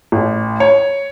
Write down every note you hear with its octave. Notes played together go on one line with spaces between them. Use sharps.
A1
C#5